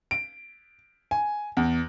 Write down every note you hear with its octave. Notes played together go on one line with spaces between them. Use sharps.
D7
G#5
E2